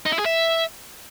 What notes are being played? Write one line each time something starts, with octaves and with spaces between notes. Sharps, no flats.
D#4
E4
G#4
E5